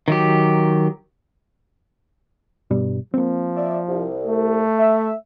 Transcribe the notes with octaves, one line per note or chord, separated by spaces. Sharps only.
D#3 F#3 G4
G2 B2 G3
F3 A#3 C4
D5 E5
C2
A3
E5